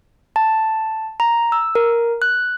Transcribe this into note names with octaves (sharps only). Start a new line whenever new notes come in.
A5
A#5
E6
A#4
F#6